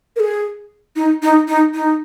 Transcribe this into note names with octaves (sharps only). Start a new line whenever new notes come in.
A#4
G#4
D#4
D#4
D#4
D#4